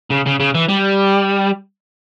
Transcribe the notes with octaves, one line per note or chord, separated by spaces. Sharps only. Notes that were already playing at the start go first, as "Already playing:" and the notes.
C#3
C#3
C#3
E3
G3